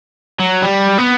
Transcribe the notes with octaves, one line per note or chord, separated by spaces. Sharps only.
F#3
G3
B3